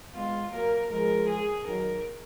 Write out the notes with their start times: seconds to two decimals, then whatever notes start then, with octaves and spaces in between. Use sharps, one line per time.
0.14 G#3 B3 F4
0.52 F#3 A#3 A#4
0.90 F3 G#3 A#4
1.28 G#4
1.66 D#3 F#3 A#4